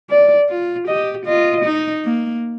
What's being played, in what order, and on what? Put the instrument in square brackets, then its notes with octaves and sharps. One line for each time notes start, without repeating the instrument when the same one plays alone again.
[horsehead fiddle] D5
[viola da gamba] F4
[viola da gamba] G4 [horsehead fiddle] D#5
[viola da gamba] F4 [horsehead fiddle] D#5
[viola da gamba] D#4
A#3